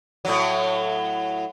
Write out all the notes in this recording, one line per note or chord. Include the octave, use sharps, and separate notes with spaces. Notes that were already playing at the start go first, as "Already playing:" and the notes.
A2 F#3